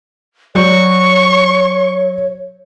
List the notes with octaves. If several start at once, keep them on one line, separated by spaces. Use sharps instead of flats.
F#3 C#5 D5 C#6 G6